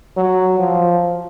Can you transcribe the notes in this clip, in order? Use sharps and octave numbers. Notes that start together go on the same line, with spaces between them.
F#3
F3